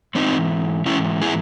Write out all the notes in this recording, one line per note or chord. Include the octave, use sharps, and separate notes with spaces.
G#2 E3 C4 D#4
G#2 E3 C#4 E4
E4 G#4